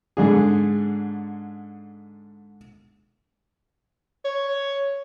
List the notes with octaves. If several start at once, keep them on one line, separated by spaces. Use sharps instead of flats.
G#2 D3 G#4
C#5